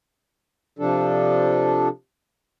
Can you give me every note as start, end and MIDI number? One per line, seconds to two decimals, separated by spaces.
0.79 1.88 48
0.79 1.88 53
0.79 1.88 62
0.79 1.88 69